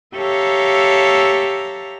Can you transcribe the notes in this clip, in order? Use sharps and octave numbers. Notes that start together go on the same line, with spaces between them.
G4 A4 C#5 E5 F5 A#5